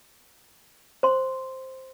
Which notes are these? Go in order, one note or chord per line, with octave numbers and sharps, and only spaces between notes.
C5 C6